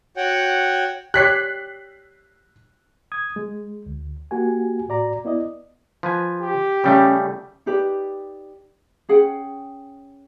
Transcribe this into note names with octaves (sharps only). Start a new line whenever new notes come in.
F#4 C#5 F#5 G5
G4 C#5 F#6 B6 C7
D#6 G#6
G#3
D2
A#3 F#4 G4 G#5
A2 F#4 D5 A#5
B3 E4 D5 D#5
F3 B4 G#5
G4
C#3 G3 A3 C#4
D#4 G4 B4 D5
C#4 G#4 F#5 G5